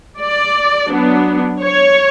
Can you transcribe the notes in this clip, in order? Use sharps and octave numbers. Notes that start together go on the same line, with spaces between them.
D5
F#3 B3 D4
C#5